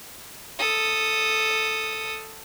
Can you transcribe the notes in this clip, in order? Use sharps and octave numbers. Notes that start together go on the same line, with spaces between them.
A4 D#6